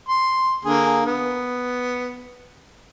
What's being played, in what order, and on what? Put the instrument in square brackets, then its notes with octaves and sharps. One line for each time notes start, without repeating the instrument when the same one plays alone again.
[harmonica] C6
D3 A#3 G#4
B3